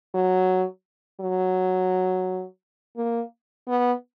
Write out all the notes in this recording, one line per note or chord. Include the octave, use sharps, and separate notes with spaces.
F#3
F#3
A#3
B3